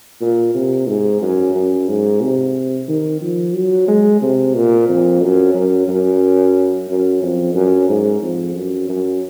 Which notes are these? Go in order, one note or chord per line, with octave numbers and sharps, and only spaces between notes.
A#2
C3
G#2
F#2
F#2
G#2
C3
D#3
F3
F#3
G#3
C3
A#2
F2
F#2
F#2
F#2
F#2
F2
F#2
G#2
F2
F#2
F#2